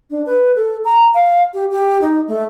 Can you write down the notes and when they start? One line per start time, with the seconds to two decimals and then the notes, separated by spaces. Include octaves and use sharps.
0.11 D4
0.26 B4
0.56 A4
0.85 A#5
1.14 F5
1.54 G4
1.71 G4
2.01 D#4
2.28 A3